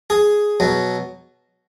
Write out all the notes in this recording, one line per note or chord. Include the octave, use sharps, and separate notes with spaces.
G#4
B2 F#3